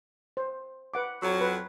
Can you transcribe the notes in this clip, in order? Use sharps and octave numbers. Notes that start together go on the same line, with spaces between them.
C5
B4 F#5 D6
F2 F#3
B4